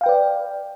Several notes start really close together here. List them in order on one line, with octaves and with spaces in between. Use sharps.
F5 G5 B4 D5